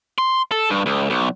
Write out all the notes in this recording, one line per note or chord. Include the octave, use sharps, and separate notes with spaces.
C6
A4
G2
C#2
B1